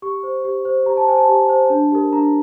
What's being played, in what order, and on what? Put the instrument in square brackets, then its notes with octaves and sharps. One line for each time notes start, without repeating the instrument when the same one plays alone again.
[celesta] G4 C#6
C5
G4
C5
G4 A#5
A5
C5 G#5
A5
G4
C5
D4
G4 A#4
D4 A#5